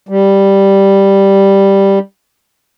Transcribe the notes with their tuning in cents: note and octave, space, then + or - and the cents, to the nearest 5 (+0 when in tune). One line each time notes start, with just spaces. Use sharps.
G3 +0